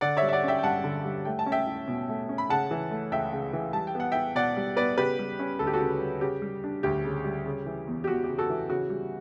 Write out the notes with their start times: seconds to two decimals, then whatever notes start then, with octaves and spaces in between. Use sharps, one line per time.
0.01 D3 D5 F#5
0.17 C#5 E5
0.22 G3
0.29 E5
0.33 D5 F#5
0.43 C#4 E5 G5
0.59 G5
0.63 G2 F#5 A5
0.84 D3
1.04 G3
1.25 A3 G5
1.39 A5
1.46 C#4
1.52 E5 G5
1.66 E4
1.88 B2
2.09 A3
2.29 C#4
2.38 B5
2.49 C#3 F#5 A5
2.71 E3
2.91 A3
3.11 C#2 E5 G5
3.33 C#3
3.53 E3
3.73 G3 A5
3.87 G5
3.95 B3 F#5
4.12 E4 E5 G5
4.35 B2 D5 F#5
4.57 G3
4.76 B3 B4 D5
4.98 C#3 G4 B4
5.19 G3
5.39 C#4
5.59 D2 A4
5.67 G4
5.73 F#4 A4
5.81 C#3
6.01 G3
6.21 C#3 G4
6.42 G3
6.64 D4
6.83 D2 G4
7.04 C#3
7.25 G3
7.46 C#3
7.66 E3
7.87 E2
8.04 G4
8.07 E2 F#4
8.24 G4
8.29 C#3
8.38 F#4 A4
8.50 E3
8.69 C#3 F#4
8.90 G3